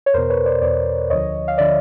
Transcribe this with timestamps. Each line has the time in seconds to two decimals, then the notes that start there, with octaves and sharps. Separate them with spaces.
0.06 C#5
0.14 E2 B2 A#4 C5
0.30 B4 C#5
0.46 C5 D5
0.62 E2 B2 C5 D5
1.10 D2 D3 F3 C#5 D#5
1.48 F5
1.58 D3 F3 D5 E5